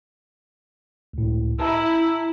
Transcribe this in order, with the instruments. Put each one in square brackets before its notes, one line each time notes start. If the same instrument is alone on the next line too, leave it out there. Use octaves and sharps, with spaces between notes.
[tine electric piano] C#2 A2
[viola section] E4 [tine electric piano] A5 A#5